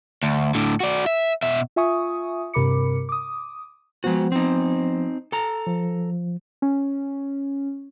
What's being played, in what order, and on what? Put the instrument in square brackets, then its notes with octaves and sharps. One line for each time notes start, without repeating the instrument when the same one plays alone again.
[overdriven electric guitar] D2
A2 D3
F#4 D5
E5
B2 E5
[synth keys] F4 E5 G#5 C#6 D#6
G2 C3 A#4 B5 D6 C#7
D6 D#6
[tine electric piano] F3 B3 C5 [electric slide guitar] G#3 F#4
[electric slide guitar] C4 D#4
A4 A#5
[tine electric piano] F3
[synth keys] C#4